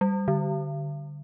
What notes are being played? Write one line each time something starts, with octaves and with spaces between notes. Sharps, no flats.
G3
D3